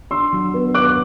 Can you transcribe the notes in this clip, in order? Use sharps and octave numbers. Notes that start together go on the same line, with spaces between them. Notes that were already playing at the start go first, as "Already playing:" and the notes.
D4 C6 E6
F#3
B3
B3 D6 F#6